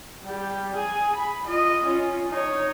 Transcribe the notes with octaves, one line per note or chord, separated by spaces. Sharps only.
G3 G4
G#4 G#5
B5
F4 D#5
C#4 F4
D#4 C#5